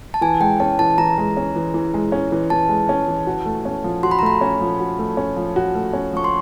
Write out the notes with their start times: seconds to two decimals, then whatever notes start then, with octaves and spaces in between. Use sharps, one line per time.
0.14 A5
0.21 E3 G#5
0.40 G#3 G5
0.60 C#4 A5
0.79 E3 A5
0.98 E3 A#5
1.18 G#3
1.37 C#4
1.56 E3
1.74 E3
1.94 G#3
2.12 C#4
2.32 E3
2.50 E3 A5
2.69 G#3
2.89 C#4
3.08 E3
3.27 F#4
3.46 A3
3.65 C#4
3.84 F3
4.03 F#4 C6
4.11 B5
4.19 A#5
4.22 A3 B5
4.41 C#4
4.61 F3
4.80 F#4
4.99 A3
5.17 C#4
5.36 F3
5.56 F#4
5.75 A3
5.93 C#4
6.13 F3 C#6
6.24 C6